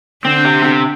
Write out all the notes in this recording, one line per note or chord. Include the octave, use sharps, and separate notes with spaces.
D3 C4 D4
C3
C3